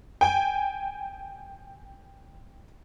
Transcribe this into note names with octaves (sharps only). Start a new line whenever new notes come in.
G5 G#5